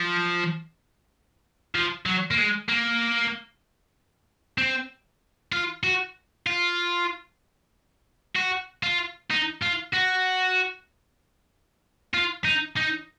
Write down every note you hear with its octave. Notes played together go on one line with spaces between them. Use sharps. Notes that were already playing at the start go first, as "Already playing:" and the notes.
Already playing: F3
F3
F#3
A#3
G#3
A#3
C4
F4
F#4
F4
F#4
F4
D#4
F4
F#4
F4
D#4
D#4